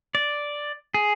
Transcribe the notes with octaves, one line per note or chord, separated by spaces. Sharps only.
D5
G#4